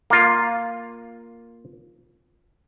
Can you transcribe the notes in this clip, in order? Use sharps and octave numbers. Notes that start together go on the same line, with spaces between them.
A#3 F4